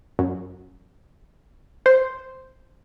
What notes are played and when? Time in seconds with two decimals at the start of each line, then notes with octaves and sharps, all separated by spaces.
0.19 F#2
1.86 C5